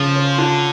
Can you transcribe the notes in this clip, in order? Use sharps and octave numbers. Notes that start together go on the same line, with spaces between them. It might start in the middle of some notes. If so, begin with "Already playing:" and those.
Already playing: C#3 F3
C#4
D3 F4